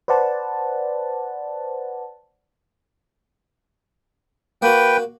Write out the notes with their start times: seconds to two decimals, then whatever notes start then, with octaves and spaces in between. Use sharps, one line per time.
0.08 B4 C5 D5 F#5 A5
4.62 A#3 F#4 B4 G5